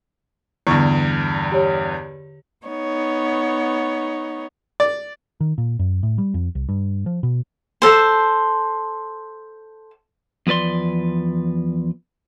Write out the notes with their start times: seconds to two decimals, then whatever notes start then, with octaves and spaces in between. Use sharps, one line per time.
0.67 E2 G2 D3 C#6
1.52 G4 C#5
2.67 B3 D#4 C#5
4.80 D5
5.41 D#3
5.58 A#2
5.79 F#2
6.03 A2
6.18 G3
6.34 F2
6.55 C2
6.69 G2
7.06 F3
7.23 B2
7.82 A4 C5
10.47 E2 F3 B4 D5 C6